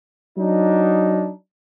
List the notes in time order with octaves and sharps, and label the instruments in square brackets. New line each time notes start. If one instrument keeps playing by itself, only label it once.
[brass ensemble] F#3 D4 D#4